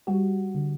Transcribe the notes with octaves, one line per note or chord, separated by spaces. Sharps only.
G3 F#4
D3